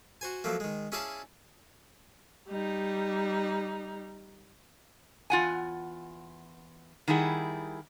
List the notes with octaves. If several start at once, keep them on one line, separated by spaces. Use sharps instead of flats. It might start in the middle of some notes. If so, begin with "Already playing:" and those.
F#4 C5 G#5
F3 F#3 A3 A#3
D#3 G#3
C#4 E4 G#4 D5 F5 A5
G3 D#4
E2 F4 F#5 G#5
D#3 G3 E4 G#4 F#5